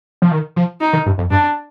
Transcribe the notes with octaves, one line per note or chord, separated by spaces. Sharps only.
F3
D#3
F3
D#4
D#3
G2
F2
G2 D4